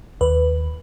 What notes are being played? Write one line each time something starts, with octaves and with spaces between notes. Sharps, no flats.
D#2 B4